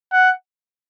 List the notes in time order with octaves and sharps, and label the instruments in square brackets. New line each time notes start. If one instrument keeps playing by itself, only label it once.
[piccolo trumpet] F#5